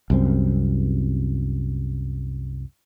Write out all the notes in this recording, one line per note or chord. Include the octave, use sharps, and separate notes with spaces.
C2 F#2 C4